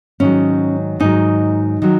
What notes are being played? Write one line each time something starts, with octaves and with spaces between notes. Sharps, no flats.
G#2 D#3 F#3 C#4
G#2 D#3 F#3 D#4
D#3 F#3